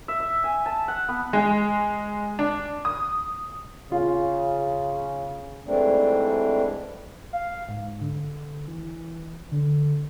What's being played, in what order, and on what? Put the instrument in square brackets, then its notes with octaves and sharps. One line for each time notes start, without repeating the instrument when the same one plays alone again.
[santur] E5
E5
G#5
A5
F#5
B3
[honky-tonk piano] G#3
D4
D#6
[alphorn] C#3 [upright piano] F4
[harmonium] G#2 E3 G3 A3 C4 D4
[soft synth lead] F5
G#2
D3
E3
D3